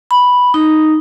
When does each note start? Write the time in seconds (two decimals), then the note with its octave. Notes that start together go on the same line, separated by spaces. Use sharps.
0.11 B5
0.54 D#4